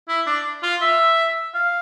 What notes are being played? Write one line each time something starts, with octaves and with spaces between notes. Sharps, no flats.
E4
D4
F4
E5
F5